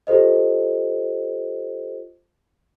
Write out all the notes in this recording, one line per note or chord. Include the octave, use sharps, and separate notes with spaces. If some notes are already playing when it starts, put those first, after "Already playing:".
F4 G4 A4 C5 D#5